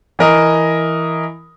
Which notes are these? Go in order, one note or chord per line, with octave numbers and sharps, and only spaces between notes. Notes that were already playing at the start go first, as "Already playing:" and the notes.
E3 A#4 D#5